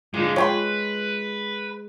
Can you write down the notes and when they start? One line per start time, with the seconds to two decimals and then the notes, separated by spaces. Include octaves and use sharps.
0.14 A#2 D3 G#3
0.36 G#3 B4 C#5 G5 C6